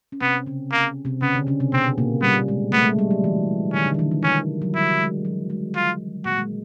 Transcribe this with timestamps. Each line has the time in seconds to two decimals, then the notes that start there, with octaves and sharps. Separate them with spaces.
0.12 C#4
0.21 C3 B3 C4
0.46 C#3 C#4
0.72 A#3
1.05 C3 C4
1.22 C#3 B3 C#4
1.34 D3 D4
1.47 C#3 C#4
1.60 C3 C4
1.73 B2 B3 C4
1.98 A#2 A#3
2.22 G3 B3
2.48 G#3
2.73 A3 B3
2.86 G#3
2.99 G3
3.11 F#3
3.24 E3
3.73 D#3 C#4
3.86 D3
3.94 E3
3.99 D#3
4.11 D#3
4.23 D#3 C#4
4.62 F#3
4.74 G3 E4
5.00 G#3
5.25 F#3
5.50 G#3
5.75 F4
6.25 A#2 A#3 F#4
6.38 G#3